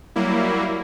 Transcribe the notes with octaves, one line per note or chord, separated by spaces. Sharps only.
F#3 G3 A#3 E4